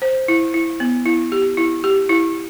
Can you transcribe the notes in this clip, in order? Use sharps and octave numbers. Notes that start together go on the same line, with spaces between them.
C5
E4
E4
B3
E4
G4
E4
G4
E4